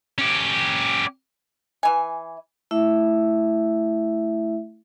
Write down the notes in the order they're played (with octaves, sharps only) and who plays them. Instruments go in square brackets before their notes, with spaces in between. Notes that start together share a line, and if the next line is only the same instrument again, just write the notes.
[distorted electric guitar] C#4 G4
[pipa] E3 G#5
[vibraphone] A3 E4 E5